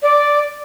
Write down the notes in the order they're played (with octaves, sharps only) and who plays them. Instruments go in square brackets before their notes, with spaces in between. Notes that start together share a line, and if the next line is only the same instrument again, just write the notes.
[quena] D5